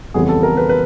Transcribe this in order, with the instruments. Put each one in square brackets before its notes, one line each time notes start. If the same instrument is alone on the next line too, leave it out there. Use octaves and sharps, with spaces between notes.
[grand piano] F2 C#3 E3 G3 B3 G#4
A4
A#4
B4
B4